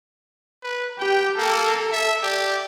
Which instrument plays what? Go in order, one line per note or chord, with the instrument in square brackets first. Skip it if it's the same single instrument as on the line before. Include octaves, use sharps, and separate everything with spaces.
[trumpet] B4
[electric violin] G4 [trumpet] G5
[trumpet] A#3 [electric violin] A4
[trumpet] E5
[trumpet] G4 [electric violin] D5